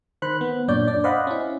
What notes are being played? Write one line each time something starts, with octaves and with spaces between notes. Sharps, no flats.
D#3 C5 B5 F#6
B3
F#2 A#2 D4 C#5 D5 G6
D4 D5
C5 D5 D#5 F5 F#5 B5
C#4 E4